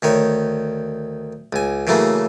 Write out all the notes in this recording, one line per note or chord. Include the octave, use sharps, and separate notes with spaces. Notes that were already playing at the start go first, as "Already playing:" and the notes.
D2 D#3 C#5
C#2 G#5
C#3 E3 F#3 A3 A#3